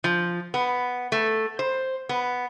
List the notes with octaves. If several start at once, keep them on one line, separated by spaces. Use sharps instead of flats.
F3
B3
A3
C5
B3